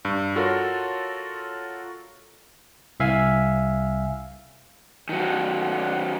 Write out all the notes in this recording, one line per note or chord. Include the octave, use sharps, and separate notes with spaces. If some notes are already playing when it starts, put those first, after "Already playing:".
G2
F4 F#4 A4 A#4 C#5
C2 E5 F5 G#5
D#3 F#3